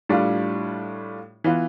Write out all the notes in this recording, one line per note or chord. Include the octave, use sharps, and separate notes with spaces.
A2 G3 D4 F4
E3 B3 F4